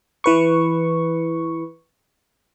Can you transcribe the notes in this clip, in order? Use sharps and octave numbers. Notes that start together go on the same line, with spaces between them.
E3 B4 C#6